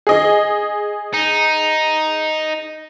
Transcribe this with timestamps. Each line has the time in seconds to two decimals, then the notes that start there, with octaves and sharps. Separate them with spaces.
0.07 G#4 D#5
1.14 D#4